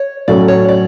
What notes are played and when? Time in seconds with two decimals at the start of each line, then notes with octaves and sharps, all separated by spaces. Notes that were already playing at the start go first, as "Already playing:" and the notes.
Already playing: C#5
0.28 A2 F#3 A3 C#4 F#4 D5
0.48 C#5
0.69 D5